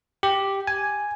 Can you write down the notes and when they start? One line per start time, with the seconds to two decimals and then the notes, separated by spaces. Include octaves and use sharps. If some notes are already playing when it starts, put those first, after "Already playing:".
0.23 G4
0.67 G#5